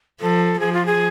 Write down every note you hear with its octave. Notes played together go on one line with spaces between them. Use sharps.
F3 A4
F3 G#4
F4
G#4